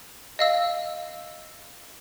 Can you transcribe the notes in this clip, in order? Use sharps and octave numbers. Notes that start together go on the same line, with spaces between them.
D#5 F5 E6